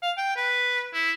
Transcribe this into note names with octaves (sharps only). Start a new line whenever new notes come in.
F5
G5
B4
E4